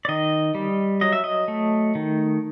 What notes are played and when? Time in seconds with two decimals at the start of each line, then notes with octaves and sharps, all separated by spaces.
0.05 D5
0.08 D#3 D#5
0.55 G3
1.01 F#3 D#5
1.12 E5
1.24 D#5
1.48 A3
1.95 D#3